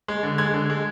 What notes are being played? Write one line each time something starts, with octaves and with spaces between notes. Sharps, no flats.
G#3
D3
G#3 G#6
D3
G#3